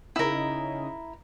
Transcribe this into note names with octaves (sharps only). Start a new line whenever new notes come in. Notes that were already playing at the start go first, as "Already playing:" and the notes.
C#3 D#4 E4 A#4